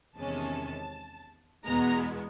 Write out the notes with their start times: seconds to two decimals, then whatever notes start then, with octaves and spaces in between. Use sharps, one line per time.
0.16 E2 C3 D#3 G#3 C#4 A5
1.65 E2 B2 G#3 B3 A#5